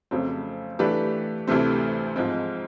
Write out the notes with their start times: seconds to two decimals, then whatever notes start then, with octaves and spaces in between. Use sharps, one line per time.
0.11 F2 C#3 F#3 A3 C4
0.79 E3 A3 D4 G4 B4
1.48 D2 C3 E3 A3 C4
2.16 G#2 F3 G#3 C4